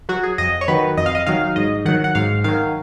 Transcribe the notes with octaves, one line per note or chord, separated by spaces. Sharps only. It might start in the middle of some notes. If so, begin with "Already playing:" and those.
F#3 F#4
G#4
F2 D#5
C#5
D#3 F#3 B4
F2 D#5
F5
D#5
D#3 F#3 F5
G#2 D#5
D#3 F#3 F#5
F#5
G#2 F5
D#3 F#3 F5